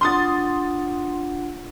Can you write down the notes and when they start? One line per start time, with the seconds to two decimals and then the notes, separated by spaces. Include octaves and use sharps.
0.01 D4 F4 F#5 C6 D#6 A6